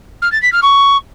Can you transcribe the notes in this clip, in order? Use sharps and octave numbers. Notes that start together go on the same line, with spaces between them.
F6
A6
B6
F6
C#6